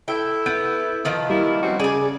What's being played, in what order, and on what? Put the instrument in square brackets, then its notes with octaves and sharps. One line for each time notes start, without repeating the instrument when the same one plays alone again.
[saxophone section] E4 A4 [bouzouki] G5
[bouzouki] B3 [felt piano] G6 D7
[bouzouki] D#3 F3 B3 [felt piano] D#6 F6 D7
[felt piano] G3 [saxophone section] A#3 E4
[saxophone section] C4 C#4 F#4
[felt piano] C#3 [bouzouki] G#4 G#5 [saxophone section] D5